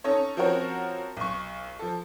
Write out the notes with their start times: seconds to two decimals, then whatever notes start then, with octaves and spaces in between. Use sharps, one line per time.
0.04 C#4 D#4 A4 C#5
0.37 F3 C4 C#4 F#4 A#4 C#5
1.17 B1 C#6
1.79 F3 A4